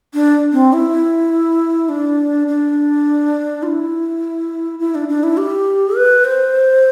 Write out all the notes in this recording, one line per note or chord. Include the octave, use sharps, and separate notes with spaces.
D4
C4
E4
D4
D4
F4
E4
E4
D4
D4
E4
G4
B4
C5